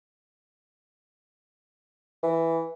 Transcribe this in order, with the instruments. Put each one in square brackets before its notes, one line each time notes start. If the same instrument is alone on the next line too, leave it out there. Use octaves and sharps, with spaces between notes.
[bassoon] E3